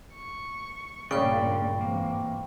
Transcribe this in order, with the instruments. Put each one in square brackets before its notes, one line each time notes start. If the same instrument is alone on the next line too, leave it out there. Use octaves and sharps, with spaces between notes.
[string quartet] C#6
[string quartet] G2 A#2 [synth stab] C#3 [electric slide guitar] F4 D5 [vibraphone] G5 B5 C#6
[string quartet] E2 G#2 C3 [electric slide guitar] A#3